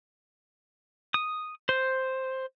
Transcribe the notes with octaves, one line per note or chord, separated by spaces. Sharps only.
D#6
C5